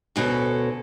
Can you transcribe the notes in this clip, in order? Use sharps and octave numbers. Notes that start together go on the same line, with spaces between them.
D2 B2 C#4 A4